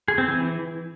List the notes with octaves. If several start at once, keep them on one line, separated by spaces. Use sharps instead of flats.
G#4
C4
E3